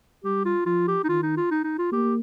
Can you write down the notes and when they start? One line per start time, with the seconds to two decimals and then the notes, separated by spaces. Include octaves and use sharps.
0.24 G3 G4
0.45 F4
0.66 F3 F4
0.88 G4
1.04 D#4
1.09 D#3 F4
1.22 D#4
1.37 F4
1.51 D#4
1.64 D#4
1.78 F4
1.92 A#3 G4